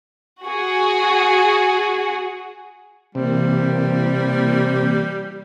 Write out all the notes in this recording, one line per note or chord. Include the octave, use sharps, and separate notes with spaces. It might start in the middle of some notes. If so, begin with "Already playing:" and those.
F#4 G#4
C3 E3 G3 A#3